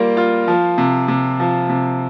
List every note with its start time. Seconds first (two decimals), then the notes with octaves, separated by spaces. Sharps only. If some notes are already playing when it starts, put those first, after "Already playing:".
Already playing: G3 A#3 F4
0.17 F4
0.48 F3
0.78 C3
1.08 C3
1.40 F3
1.69 C3